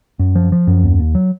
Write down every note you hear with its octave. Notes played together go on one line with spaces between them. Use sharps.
F#2
F3
F3
F#2
D#2
D#2
F#3